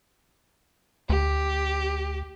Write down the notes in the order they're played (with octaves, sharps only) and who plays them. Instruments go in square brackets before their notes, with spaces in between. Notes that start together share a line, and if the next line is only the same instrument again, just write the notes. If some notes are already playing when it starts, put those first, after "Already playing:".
[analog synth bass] D2 [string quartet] G4